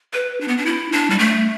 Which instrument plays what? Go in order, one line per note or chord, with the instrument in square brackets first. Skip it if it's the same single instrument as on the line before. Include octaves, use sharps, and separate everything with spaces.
[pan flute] B4
D4
B3
D4
E4
D4
G3
A3